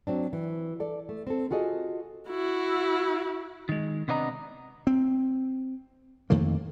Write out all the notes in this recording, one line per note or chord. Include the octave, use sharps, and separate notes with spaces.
F#3 C4 D4
E3
A4 D5
A3
C4 A4
F4 F#4 G#4 A4 D#5
E4 F#4
D#3 G#3
C3 B3 D4 D#5 A#5
C4
F2 D#3 A3 A#3